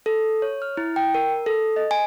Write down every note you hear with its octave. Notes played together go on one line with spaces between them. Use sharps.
A4
C#5
F6
E4
G5
A#4
A4
D#5
G#5